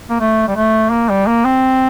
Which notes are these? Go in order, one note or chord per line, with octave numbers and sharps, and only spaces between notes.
A#3
A3
G3
A3
A#3
G3
A#3
C4